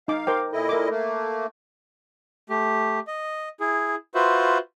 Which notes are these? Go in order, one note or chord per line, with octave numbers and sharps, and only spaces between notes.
D#4 F5 D6
A#4 C5 G5 D6
A#2 E4 A4 D#5
A#4 D6
A3 A#3
A3 G4
D#5
E4 G#4
F4 F#4 B4 C5 E5